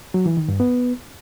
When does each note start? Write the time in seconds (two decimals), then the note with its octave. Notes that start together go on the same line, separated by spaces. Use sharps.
0.14 F#3
0.26 E3
0.37 D#3
0.48 G2
0.60 B3